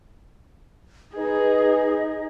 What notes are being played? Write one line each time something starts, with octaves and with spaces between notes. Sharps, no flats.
D#4 G#4 B4 D#5